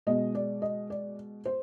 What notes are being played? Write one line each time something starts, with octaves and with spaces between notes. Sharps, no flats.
B2 G#3 D#5
D5
D#5
D5
C5